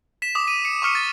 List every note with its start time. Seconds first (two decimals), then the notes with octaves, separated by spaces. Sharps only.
0.22 B6 E7
0.35 D6 D#6
0.48 D#7
0.65 C#7
0.82 C#6 D6 F6 C#7
0.95 A6